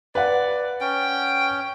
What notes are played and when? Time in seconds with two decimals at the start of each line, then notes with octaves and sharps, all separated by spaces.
0.15 B4 D5 F#5
0.81 C#4 G5